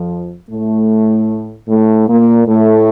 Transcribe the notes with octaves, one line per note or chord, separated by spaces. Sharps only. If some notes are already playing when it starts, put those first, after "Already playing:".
Already playing: F2 F3
A2 A3
A2 A3
A#2 A#3
A2 A3